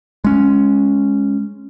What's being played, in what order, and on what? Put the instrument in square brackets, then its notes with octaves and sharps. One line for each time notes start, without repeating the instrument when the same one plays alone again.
[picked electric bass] G#3 C#4